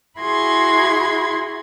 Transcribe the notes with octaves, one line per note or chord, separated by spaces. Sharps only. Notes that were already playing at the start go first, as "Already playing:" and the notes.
E4 F#4 G#4 B5 C6 G#6